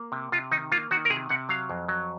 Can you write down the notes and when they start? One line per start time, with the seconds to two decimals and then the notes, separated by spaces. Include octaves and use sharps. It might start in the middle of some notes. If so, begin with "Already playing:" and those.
Already playing: A#3
0.12 C3
0.32 C3 F4
0.51 D#3 D#4
0.72 A#3 F4
0.91 D#3 F#4
1.05 A#4
1.10 C3 G#4
1.29 C3 F#5
1.49 F#3 F5
1.70 F2
1.88 F#3